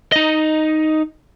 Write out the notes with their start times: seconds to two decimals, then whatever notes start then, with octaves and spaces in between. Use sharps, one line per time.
0.12 D#4 D#5